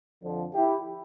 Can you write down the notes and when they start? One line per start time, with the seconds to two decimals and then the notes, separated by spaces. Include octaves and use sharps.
0.21 F2 D3 F3
0.54 E4 G4